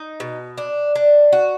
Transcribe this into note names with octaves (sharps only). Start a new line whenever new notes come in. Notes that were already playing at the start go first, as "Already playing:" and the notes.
Already playing: D#4
B2
D4
D4
F#4